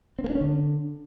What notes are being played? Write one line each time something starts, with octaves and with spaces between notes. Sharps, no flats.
C4
A#3
D4
C#4
D3